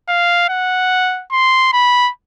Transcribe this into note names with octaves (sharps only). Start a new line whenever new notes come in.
F5
F#5
C6
B5